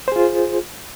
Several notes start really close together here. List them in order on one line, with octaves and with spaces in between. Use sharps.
C5 G#4 F4